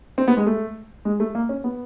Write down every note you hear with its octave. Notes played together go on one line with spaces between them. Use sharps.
C4
B3
G#3
A3
G#3
A3
A#3
C#4
B3